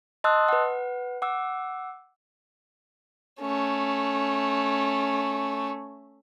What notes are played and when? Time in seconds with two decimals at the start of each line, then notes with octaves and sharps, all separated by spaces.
0.24 D#5 A5 C6 D#6 E6 F#6
0.49 B4 F#5
1.22 F#5 D6 E6
3.41 A3 C#4